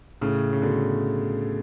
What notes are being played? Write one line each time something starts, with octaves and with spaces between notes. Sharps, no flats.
A2 C#3
C#3
B2 D3